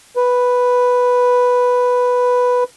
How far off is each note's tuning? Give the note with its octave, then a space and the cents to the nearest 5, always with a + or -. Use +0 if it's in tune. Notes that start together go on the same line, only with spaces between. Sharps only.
B4 +0